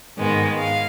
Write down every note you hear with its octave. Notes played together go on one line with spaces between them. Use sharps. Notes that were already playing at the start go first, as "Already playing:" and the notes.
G#2 D#3 G#3 B3
F5